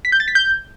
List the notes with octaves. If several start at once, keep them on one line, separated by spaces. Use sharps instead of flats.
B6
G6
A6
B6
G6